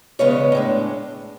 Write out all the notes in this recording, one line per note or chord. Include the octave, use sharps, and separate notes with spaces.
E2 C#3 G#3 B3 C#5
A2 G#3 D4